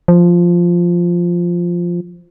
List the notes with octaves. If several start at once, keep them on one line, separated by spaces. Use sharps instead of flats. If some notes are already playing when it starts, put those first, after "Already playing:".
F3